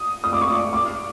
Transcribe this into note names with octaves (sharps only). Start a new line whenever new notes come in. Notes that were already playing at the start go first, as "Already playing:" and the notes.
Already playing: D#6
D#6
D6
C#6
D6
D6